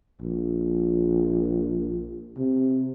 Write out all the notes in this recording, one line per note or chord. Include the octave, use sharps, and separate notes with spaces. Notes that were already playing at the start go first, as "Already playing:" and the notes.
A#1
C3